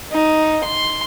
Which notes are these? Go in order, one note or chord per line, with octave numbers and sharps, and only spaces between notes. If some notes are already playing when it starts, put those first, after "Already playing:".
D#4
C6